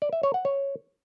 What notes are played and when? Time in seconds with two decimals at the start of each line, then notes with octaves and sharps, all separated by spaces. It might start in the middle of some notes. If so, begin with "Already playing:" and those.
0.02 D5
0.13 E5
0.23 C#5
0.34 F#5
0.45 C#5